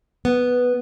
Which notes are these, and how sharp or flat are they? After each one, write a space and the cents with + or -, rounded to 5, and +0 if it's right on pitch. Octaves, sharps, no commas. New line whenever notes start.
B3 +0